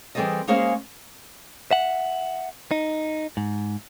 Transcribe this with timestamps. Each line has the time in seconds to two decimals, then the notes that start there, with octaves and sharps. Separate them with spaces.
0.15 E3 G3 C4 G#4 A4 D#5
0.48 G#3 A#3 C#4 G#4 C5 F5
1.71 E5 F#5
2.71 D#4
3.37 G#2